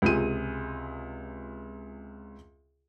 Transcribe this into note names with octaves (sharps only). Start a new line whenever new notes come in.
C#2 C3 F4 G#4 D#7